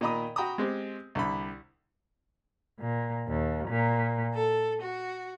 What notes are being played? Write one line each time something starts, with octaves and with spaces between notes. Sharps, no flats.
A#2 D#3 D#5 A#5 B5 D#6
F#4 G5 A#5 B5 D#6
G#3 C4 G4
C2 D3 B5
A#2
D#2
A#2
A4
F#4